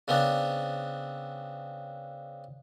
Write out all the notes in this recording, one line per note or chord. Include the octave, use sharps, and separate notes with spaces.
C#3 B3 C4 D4